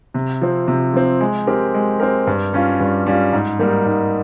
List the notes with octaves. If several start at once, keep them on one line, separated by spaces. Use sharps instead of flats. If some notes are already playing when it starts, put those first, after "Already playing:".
C3
F3 C4
C3
F3 C4
G#3
C4 G4 A#4
G#3
C4 G4 A#4
G2
G3 C#4 F4
G2
G3 C#4 F4
G#2
G3 A#3 D#4 A#4
G#2